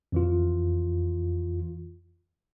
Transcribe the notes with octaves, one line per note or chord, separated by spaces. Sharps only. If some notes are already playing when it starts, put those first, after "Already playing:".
F2 E3 F4